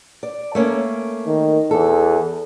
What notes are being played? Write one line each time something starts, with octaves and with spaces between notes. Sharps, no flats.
D5
A3 A#3 C#4
D#3
E2 A4